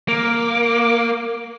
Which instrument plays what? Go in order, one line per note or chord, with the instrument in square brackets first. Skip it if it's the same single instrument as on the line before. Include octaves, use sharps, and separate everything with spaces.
[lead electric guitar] A#3 [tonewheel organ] D6